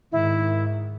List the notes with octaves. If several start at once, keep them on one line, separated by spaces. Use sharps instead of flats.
G#2 D#3 E4